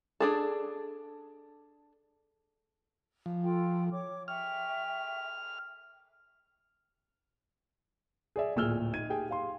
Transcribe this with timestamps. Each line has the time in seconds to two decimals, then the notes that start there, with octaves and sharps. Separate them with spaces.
0.20 D4 G#4 A4
3.26 F3
3.44 F4 A4 G5
3.91 C#5 D6
4.28 E5 G5 C#6 F6
8.36 G#4 D5 E5
8.56 D1 A#2 G#4 E6 F6 G7
8.94 D#4 G#6 D#7
9.10 G4 G#4 G5 G#5
9.29 G4 F5 C6